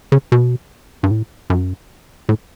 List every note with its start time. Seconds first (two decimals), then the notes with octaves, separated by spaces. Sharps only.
0.12 C#3
0.32 B2
1.03 G2
1.11 A2
1.50 F#2
2.29 A2